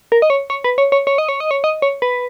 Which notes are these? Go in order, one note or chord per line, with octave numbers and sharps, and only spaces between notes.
A#4
D#5
C#5
C#5
B4
C#5
C#5
C#5
D#5
C#5
D#5
C#5
D#5
C#5
B4